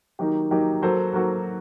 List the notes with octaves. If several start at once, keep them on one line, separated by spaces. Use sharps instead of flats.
D#3 F#3 A#3 D#4 G4
D#3 F#3 A#3 D#4 G4
F#3 A#3 F#4 A4 C5
F#3 A#3 F#4 A4 C5